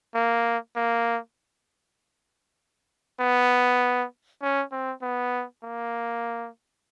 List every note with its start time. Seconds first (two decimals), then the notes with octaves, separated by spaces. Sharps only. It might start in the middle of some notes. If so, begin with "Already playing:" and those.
0.14 A#3
0.76 A#3
3.20 B3
4.42 C#4
4.72 C4
5.02 B3
5.63 A#3